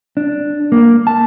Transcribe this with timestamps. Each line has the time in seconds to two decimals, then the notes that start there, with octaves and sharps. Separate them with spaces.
0.17 D4
0.72 A#3
1.07 A5